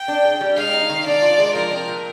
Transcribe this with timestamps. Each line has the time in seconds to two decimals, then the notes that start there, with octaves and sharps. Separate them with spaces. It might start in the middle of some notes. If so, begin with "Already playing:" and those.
Already playing: G5
0.08 D4
0.25 G#4
0.41 G3
0.57 G#3 F5
0.73 D#4
0.90 D#3
1.06 D4 D5
1.22 F4
1.38 G#3
1.55 F3 A#4
1.71 C4
1.88 A#2